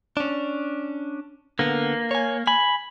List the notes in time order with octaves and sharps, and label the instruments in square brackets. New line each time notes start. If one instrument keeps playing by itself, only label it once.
[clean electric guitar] C#4 D4
[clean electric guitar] D3 B3 [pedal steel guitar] A#3
[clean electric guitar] C#5 G#5
[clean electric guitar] G#5 [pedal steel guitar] B5